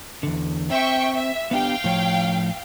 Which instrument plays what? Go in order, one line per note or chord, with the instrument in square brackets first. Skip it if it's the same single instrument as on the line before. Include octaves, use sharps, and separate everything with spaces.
[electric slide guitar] E2 D3
[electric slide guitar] C4 [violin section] E5 G5 C#6
[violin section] E5
[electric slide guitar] B3 D4 G4 [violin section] F5 G5
[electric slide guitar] A2 F3 C#5